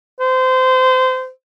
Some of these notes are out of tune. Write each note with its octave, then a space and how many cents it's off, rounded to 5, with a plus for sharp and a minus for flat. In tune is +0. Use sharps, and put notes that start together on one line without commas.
C5 -25